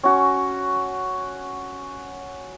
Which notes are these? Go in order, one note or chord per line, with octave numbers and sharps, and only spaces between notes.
C#4 F#4